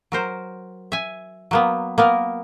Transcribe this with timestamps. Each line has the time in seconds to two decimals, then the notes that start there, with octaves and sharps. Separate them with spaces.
0.12 F#3 A#4 C5
0.92 E5 G#5
1.51 F#3 A#3 B3
1.98 A#3 B3 A#4